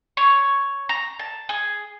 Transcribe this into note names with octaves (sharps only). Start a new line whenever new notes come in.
C#5
A#5
A5
G#4